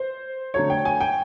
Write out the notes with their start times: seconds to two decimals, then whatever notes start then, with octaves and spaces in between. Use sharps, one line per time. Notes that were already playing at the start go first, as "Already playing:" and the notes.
Already playing: C5
0.54 D3 F#3 A3 C#5
0.70 G5
0.85 G#5
1.01 G5